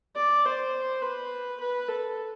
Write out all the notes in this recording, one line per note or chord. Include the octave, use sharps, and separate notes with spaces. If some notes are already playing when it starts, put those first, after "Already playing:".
D5
C5
B4
B4
A4